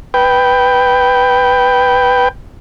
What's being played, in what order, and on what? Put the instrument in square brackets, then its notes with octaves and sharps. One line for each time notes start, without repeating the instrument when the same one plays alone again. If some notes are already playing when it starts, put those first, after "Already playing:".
[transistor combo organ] B4 G5